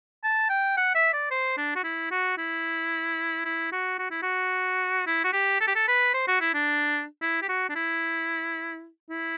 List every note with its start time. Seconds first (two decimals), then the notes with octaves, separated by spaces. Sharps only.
0.24 A5
0.50 G5
0.77 F#5
0.95 E5
1.13 D5
1.31 C5
1.57 D4
1.76 F#4
1.84 E4
2.11 F#4
2.38 E4
3.45 E4
3.72 F#4
3.99 F#4
4.11 E4
4.23 F#4
5.07 E4
5.24 F#4
5.33 G4
5.61 A4
5.67 G4
5.75 A4
5.88 B4
6.14 C5
6.28 F#4
6.41 E4
6.54 D4
7.22 E4
7.42 G4
7.48 F#4
7.69 D4
7.75 E4
9.10 E4